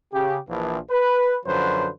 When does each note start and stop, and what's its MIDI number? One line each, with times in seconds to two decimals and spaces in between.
0.13 0.37 49
0.13 0.37 67
0.49 0.79 34
0.49 0.79 52
0.49 0.79 53
0.90 1.36 71
1.45 1.88 42
1.45 1.88 50
1.45 1.88 53
1.45 1.88 54
1.45 1.88 71
1.45 1.88 72